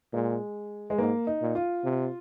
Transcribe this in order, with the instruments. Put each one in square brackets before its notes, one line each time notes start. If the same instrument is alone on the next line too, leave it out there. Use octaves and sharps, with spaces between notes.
[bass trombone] A#2 [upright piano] G#3
[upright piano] G#3
[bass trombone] G#2 [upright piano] A#3
[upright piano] D#4
[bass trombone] A#2
[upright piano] F4
[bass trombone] C3